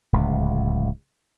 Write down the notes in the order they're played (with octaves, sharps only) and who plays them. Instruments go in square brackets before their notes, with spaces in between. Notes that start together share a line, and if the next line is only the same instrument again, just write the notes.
[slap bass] D1 C#2